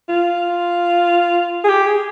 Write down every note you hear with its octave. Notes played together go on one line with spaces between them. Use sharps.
F4
G#4
G4
G#4